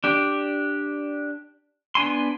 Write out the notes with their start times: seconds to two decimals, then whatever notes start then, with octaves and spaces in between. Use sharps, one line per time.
0.04 D4 G4 D5
1.95 B3 D4 G#5 C6